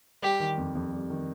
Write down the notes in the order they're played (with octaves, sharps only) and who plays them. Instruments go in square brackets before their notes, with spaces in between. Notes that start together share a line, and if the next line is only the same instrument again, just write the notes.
[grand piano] G3 [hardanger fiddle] G4
[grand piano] D#3
F2
F2
G3
D#3